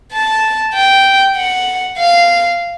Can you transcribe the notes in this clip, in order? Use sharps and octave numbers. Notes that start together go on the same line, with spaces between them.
A5
G5
F#5
F5